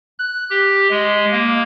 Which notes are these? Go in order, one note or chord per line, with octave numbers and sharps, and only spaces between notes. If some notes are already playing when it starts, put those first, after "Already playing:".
F#6
G4
G#3
A#3